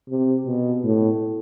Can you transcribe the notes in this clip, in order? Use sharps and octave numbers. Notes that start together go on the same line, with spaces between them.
C3
B2
A2